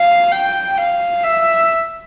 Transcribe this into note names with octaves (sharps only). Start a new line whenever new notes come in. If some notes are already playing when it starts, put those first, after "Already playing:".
Already playing: F5
G5
F5
E5